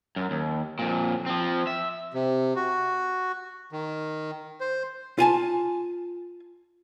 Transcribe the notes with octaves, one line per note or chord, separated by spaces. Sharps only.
F#2
D#2
F2 A#2
F3 C4
E5
C3
F#4
D#3
C5
F4 G#5 A5